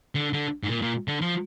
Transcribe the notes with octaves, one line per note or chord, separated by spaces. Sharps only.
D3
D3
G#2
A#2
A#2
D3
F3